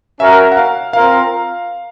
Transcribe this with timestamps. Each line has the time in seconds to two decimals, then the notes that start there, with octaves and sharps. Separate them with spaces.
0.20 C#4 F#4 A#4 E5
0.52 F#5
0.57 F5
0.93 C4 F4 A#4 F5